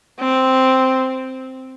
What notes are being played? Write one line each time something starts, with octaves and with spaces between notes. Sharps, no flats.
C4